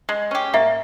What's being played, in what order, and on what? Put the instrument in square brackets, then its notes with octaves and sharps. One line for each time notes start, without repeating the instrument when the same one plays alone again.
[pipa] G#3
C#4 G4
[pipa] A#3 [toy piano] E5